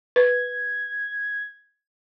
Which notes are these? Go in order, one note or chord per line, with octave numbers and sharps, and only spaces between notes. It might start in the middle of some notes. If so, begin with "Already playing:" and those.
B4 G#6